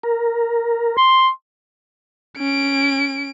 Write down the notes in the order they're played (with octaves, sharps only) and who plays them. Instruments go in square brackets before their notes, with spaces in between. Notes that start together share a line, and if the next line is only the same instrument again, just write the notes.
[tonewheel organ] A#4
[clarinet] C6
[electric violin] C#4 D7